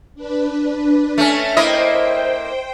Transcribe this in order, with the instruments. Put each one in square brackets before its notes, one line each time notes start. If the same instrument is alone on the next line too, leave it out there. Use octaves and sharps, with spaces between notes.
[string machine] D4 B4
[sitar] A3 C#4 [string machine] A5 F6 A#6
[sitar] A#3 E4 D#5 [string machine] C5 G5